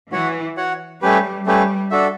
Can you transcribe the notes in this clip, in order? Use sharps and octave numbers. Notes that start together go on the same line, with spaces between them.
E3 F#4 C#5 F#5
F#4 C#5 F#5
G3 A3 C#4 G4 B4
G3 A3 C#4 G4 B4
D4 F#4 A4 E5